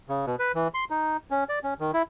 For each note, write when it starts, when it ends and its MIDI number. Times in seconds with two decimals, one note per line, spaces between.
0.09 0.26 49
0.26 0.36 47
0.39 0.52 71
0.55 0.68 52
0.74 0.85 84
0.90 1.17 63
1.31 1.44 61
1.49 1.59 74
1.64 1.74 61
1.80 1.91 51
1.94 2.02 64